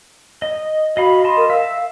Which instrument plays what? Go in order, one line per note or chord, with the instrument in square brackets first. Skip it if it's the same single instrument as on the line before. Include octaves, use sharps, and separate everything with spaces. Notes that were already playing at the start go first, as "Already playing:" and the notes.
[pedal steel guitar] D#5
[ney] F#4 [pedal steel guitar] D#5 F5 B5
[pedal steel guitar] D#5 A5 C6
[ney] A#4
[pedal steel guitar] E5 E6 [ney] F5